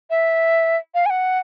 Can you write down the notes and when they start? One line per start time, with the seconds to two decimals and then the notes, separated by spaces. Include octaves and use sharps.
0.10 E5
0.95 F5
1.06 G#5
1.10 F#5